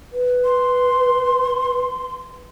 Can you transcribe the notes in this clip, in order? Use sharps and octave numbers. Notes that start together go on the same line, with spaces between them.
B4
C6